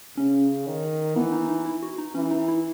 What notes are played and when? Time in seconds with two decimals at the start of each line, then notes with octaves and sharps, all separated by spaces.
0.17 C#3 C#4
0.66 D#3
1.16 E3 B3
1.32 D#4
1.48 D#4
1.66 E4
1.83 F#4
1.98 D#4
2.15 E3 C#4
2.31 D#4
2.48 E4